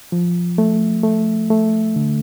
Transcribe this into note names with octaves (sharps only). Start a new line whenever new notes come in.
F3
A3
A3
A3
D3